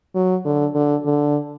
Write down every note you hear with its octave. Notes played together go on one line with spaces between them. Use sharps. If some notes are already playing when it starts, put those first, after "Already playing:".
F#3
D3
D3
D3